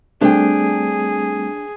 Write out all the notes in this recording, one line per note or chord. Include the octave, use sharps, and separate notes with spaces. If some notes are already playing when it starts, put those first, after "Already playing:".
G3 A3 C4 D4 G#4 G5